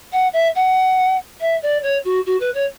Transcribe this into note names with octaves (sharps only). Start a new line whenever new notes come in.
F#5
E5
F#5
E5
D5
C#5
F#4
F#4
B4
C#5